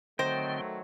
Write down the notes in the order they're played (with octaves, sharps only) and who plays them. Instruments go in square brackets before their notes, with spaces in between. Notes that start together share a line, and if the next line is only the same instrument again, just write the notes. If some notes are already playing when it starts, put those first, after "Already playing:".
[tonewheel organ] D3 C4 [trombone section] D#3 F#3 A3 [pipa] C5 [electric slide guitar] D#5 G5